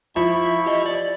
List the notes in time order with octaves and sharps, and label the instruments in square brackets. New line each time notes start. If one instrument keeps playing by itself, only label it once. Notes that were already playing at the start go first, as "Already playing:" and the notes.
[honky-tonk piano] F3 [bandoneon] E4 B5 C#6 [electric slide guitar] E5
[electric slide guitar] G4 D#5
D5